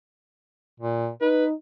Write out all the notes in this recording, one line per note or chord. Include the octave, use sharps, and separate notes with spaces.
A#2
D#4 B4